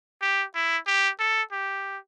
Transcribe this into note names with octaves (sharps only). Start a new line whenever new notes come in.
G4
E4
G4
A4
G4